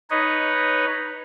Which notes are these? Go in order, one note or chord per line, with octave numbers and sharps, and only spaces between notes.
D#4 B4 C#5 D#5